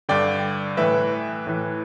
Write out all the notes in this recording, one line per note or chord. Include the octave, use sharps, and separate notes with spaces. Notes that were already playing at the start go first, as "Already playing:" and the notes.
G2 D3 D5 G5
A2 E3 B4 E5
A2 E3